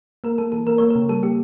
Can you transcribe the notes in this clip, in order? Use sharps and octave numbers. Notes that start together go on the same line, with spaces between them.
A#3 A#4
A#3 A4
E3 A4
A#3 A#4
A#3 C#5
C#3 A#4
G3 A4
A#3 G4